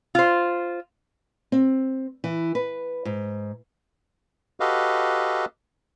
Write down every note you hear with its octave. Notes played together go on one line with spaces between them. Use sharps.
F4 C5
C4
E3
B4
G#2
F#4 G4 A4 B4 D#5 F5